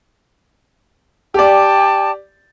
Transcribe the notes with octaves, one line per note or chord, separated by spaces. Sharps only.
G4 D5 G5 A5 D6